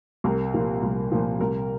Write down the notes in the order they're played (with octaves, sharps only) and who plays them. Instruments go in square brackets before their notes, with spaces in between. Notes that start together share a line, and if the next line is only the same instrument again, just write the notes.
[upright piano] C2 A#4
A#2 F3
C2
A#2 F3
C2 A#4